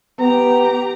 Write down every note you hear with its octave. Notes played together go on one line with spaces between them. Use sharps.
B3 G4 A#5